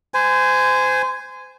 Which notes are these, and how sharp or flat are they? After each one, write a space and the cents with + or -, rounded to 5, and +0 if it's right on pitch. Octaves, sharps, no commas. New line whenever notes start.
C5 -30 G#5 +0